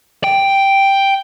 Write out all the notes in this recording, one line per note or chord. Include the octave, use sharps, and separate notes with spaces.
G5